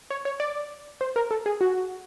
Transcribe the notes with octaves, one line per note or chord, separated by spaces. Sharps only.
C#5
C#5
D5
C5
A#4
A4
G#4
F#4